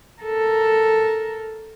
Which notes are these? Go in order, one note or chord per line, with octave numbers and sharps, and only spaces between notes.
A4 A#4